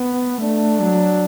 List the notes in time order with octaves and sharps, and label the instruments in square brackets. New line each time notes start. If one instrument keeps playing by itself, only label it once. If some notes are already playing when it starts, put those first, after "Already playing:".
Already playing: [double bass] B3
[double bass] A3 [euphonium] D4
[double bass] F#3